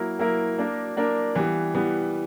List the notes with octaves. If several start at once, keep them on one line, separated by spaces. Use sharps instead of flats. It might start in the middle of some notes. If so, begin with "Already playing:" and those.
Already playing: F#3 A#3 E4 A#4
F#3 A#3 E4 A#4
A#3 D4 A#4
A#3 D4 A#4
E3 G3 B3
E3 G3 B3